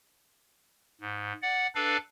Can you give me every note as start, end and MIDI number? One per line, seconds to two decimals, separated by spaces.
1.01 1.33 44
1.42 1.67 74
1.42 1.67 78
1.75 1.97 62
1.75 1.97 69
1.75 1.97 71
1.75 1.97 74
1.75 1.97 77